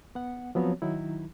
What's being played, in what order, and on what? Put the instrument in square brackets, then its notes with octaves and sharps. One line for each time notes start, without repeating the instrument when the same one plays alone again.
[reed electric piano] B3 F#5
F3 F#3 B3 C4 F#4 C#5
D#3 F#3 D#4 E4